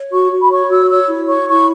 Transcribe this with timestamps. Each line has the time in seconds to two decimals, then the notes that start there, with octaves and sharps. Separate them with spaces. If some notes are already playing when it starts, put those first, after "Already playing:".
Already playing: C#5
0.12 F#4 C#6
0.32 F#4
0.41 B5
0.50 C#5 C#6
0.70 F#4 E6
0.89 C#5 E6
1.08 E4
1.28 C#5 C#6
1.48 E4 C#6